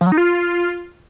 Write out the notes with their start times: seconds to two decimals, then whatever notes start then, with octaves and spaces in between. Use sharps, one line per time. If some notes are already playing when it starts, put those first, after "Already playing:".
0.01 F3
0.06 F#3
0.12 D#4
0.17 F4